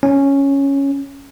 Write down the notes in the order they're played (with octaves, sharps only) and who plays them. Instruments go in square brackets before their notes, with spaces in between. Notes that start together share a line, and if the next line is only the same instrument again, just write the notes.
[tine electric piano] C#4